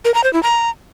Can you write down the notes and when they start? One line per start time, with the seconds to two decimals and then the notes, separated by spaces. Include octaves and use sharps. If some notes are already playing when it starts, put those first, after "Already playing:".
0.05 A#4
0.14 A#5
0.24 C5
0.33 E4
0.43 A#5